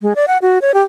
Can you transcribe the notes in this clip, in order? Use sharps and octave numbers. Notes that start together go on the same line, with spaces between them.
G#3
D5
F#5
F#4
C#5
G4